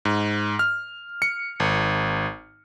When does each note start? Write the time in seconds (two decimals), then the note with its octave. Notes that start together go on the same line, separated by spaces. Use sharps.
0.05 G#2
0.59 F6
1.22 C#7
1.60 G#1